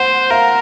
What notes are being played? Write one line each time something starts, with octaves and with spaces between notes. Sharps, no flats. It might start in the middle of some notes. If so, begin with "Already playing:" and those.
Already playing: C5 F#5
A#4 F5